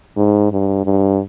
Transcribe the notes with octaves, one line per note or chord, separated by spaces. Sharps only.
G#2
G2
G2